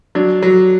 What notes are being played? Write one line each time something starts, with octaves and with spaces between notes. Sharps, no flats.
F#3 D4
F#3